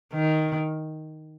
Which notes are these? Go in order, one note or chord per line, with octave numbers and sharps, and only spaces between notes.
D#3